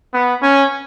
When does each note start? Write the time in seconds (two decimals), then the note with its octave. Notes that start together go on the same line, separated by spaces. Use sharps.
0.14 B3
0.42 C#4